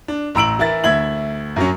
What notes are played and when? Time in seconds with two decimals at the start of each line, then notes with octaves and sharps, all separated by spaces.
0.08 D4
0.35 A1 A#5 E6 D7 F#7
0.59 E3 E4 A#4 A6
0.84 D2 E5 G#6 F#7
1.56 F#2 F#3 C#4